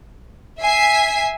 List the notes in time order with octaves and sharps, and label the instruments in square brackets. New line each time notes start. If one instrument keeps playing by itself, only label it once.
[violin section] E5 G#5 C7